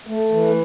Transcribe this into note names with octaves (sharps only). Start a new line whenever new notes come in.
A3
E3